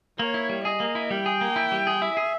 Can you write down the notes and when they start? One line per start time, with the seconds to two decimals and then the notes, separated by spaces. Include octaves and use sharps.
0.19 A#3 C#5
0.34 E4
0.49 G3
0.65 G#4 D#5
0.80 A#3
0.95 E4
1.10 G3 G5
1.26 G#4
1.41 A#3
1.56 E4
1.72 G3
1.87 G#4
2.02 E4 E5
2.17 G#4